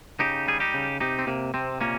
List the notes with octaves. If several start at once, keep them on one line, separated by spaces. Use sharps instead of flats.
C#3 D#4 G4
G3 G#4
D#4 G4
C#3
C3 D#4 G4
C4
C3 A#3
C3 C4
A#2 A#3 C#4